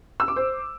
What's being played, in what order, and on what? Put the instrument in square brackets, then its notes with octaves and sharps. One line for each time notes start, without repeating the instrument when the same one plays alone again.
[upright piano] E6
D6
C5